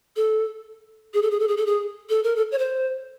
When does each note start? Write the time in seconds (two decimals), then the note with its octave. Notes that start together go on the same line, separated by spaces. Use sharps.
0.16 A4
1.14 G#4
1.22 A4
1.31 G#4
1.40 A4
1.48 G#4
1.57 A4
1.66 G#4
2.09 A4
2.23 A#4
2.36 A4
2.51 C#5
2.58 C5